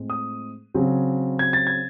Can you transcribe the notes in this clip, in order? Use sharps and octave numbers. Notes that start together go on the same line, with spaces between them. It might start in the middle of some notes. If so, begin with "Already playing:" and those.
Already playing: A2 G#3 C4
D#6
C#3 F#3 C4
G#6
A6
G#6